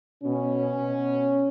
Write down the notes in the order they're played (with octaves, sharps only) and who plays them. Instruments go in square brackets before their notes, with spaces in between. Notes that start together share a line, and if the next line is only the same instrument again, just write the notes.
[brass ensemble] B2 C#4
B2